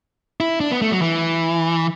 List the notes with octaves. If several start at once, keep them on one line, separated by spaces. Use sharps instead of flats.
E4
D4
B3
A3
F#3
E3